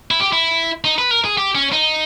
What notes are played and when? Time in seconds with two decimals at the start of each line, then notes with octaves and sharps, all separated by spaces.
0.11 E4
0.20 G4
0.33 E4
0.85 D#4
0.99 B4
1.11 A#4
1.25 G#4
1.38 G4
1.55 C#4
1.72 D#4